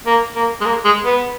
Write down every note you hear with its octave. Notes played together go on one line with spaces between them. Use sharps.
A#3
A#3
G#3
A#3
G#3
B3